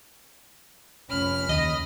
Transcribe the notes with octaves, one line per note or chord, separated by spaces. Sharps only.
F1 C#4 B5 F6
D#2 C#3 D#5